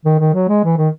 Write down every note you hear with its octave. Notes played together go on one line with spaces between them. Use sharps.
D#3
D#3
F#3
G#3
E3
D#3